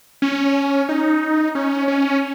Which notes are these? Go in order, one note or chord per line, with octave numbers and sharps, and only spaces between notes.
C#4
D#4
C#4
C#4